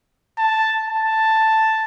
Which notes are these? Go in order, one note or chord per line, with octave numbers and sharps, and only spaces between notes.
A5
A5